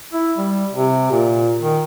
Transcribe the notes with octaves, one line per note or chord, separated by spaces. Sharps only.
E4
G3
C3
A#2
D#3